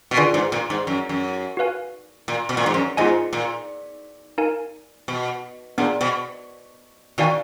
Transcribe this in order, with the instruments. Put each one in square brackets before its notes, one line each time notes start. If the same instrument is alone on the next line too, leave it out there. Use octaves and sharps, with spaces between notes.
[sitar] B2
[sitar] D3 [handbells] F4 G#4 B4 D5 G#5
[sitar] G#2
A#2
G#2
F#2
F#2
[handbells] F#4 B4 F5 G#5
[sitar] A#2
B2
A#2
G#2
F#2
[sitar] G#2 [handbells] B3 F4 G#4 D#5 G#5
[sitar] A#2
[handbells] D#4 A#4 F5 G#5
[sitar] B2
[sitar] A#2 [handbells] B3 D4 G#4 D5
[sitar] B2
[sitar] B2 D#3 [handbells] F#4 D5 F5 G#5